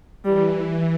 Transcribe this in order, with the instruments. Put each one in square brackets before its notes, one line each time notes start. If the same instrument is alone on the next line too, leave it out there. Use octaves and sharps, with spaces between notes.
[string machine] E3 [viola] G3